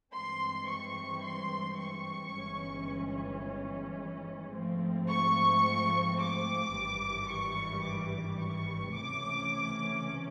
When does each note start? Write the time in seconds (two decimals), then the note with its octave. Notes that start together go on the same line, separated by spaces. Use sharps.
0.13 G2 E3 G#3 C4 C6
0.68 C#6
1.23 C6
1.79 C#6
2.34 G1 G2 E3 G#3 C#4
4.54 G#2 F3 A3 C4
5.09 C#6
6.19 D6
6.74 G#1 G2 E3 G3
7.29 C#6
7.84 D6
8.39 C#6
8.94 C#2 C3 E3 A3 C#4 D6